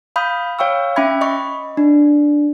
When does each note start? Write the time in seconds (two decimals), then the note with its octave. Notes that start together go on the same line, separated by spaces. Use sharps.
0.16 F5 B5 D#6 G6
0.59 C#5 F5 G5 C#6 E6
0.96 C#4 E5 G5 B5 G#6
1.21 D#5 B5 C#6
1.77 D4